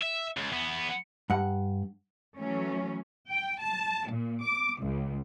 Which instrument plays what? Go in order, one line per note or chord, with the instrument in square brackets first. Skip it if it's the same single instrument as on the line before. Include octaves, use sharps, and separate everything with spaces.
[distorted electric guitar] E5
C#2
E2 B3
[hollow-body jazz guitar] G2 F#5
[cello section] E3 F#3 A3 C#4
[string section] G5
A5
A#2
D6
C#2